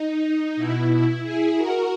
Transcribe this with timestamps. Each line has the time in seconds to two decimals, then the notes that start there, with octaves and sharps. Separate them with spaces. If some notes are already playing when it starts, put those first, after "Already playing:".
Already playing: D#4
0.56 B2 E4
0.90 E4
1.23 E4 G#4
1.57 F#4 A#4